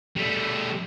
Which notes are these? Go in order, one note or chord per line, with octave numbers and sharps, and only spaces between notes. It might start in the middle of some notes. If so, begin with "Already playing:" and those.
G3 A3